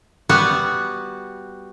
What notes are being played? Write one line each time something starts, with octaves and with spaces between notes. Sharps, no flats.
G3 B3 F#4